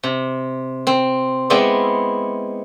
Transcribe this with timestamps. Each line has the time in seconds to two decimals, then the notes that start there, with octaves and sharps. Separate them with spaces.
0.03 C3
0.87 C4
1.50 G#3 B3 C4 E4 D5 E5